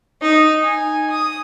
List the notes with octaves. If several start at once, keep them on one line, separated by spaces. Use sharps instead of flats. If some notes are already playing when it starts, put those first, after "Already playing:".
D#4
G#5
D#6